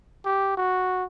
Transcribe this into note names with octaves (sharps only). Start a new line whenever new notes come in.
G4
F#4